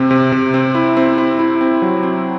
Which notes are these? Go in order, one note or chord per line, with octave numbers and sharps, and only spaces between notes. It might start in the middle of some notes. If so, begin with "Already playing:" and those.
Already playing: C3 C4
C3
C3
C4
E4
C4
E4
E4
C4
F#3
C4